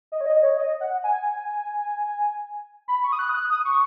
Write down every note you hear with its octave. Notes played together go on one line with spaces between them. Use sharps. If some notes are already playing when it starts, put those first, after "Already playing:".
D#5
C#5
D#5
C#5
D#5
F#5
G#5
B5
C#6
D#6
F#6
D#6
F#6
D#6
C#6